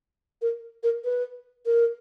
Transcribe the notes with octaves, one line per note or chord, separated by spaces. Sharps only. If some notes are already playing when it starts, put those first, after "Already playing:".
A#4
A#4
B4
A#4